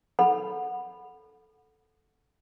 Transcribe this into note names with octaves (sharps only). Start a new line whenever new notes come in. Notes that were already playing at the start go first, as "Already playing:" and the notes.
A4 F#5 B5